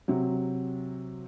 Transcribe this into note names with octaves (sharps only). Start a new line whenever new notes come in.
C3 F#3